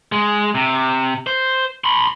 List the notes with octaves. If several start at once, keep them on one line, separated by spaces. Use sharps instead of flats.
G#3
C3
C5
B5 C6